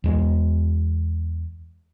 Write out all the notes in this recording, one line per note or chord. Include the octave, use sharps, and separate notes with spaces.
E2 G#3